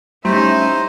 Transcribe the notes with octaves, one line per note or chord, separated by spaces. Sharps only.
G3 A3 C#4 D#4 E4 C5 A#5 C6